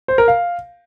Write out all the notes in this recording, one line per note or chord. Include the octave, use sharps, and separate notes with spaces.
C5
A#4
F5